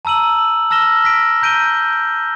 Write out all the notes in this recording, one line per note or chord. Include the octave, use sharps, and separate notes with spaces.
A5 A#5 E6 D#7 F#7
A5 E6 F6 A#6 E7 G7
A#6 B6 D7
A#5 G6 D7 D#7 G7